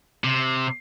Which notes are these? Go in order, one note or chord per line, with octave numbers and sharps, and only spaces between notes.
C3